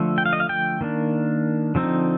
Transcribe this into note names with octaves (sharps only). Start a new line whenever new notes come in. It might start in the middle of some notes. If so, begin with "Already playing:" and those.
Already playing: D3 F3 A3
G5
F5
D#5
F5
G5
D#3 A#3 D4
D3 F3 C4 D#4